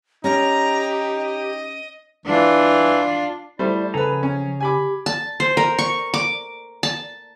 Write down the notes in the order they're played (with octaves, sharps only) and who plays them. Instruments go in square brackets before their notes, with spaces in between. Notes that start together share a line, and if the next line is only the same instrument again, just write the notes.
[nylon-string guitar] C#4 [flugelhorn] D#4 [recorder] G4 [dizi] A#5
[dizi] D#5
[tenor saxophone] E3 [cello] D4 F4
[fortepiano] G3 A3 C5 [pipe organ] E4 D5
[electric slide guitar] C#3 G#4 A#5 [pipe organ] F3 [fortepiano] A4 B4
[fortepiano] C#4
[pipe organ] G4 [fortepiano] G#5 B5 D6
[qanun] A5
C5
A#4
C#6
D6
A5